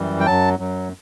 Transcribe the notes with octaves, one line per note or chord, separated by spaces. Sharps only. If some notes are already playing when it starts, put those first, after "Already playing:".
Already playing: F#2 E3 G3
G5
F#2 F#3 A5
F#2 F#3